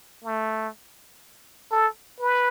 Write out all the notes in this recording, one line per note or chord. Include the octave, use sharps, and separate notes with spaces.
A3
A4
B4